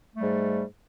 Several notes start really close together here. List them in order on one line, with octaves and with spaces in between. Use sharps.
A3 G3 G#2